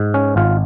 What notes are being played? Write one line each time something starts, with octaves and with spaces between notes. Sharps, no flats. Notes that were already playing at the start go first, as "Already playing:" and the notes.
Already playing: G#2
C#4
G#1 F4